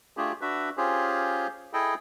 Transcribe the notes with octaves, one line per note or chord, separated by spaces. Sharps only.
A3 D4 F4 G4 G#4
D4 F#4 B4 E5
C#4 F4 G4 G#4 C5
E4 G#4 A4 D#5 G5